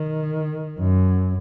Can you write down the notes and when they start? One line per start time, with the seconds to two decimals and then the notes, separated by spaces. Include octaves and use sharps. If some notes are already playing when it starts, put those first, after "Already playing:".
Already playing: D#3
0.79 F#2